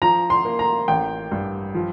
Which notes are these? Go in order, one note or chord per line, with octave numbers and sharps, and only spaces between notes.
F3 A#5
C6
A#3
A#5
A1 G5
G2
F3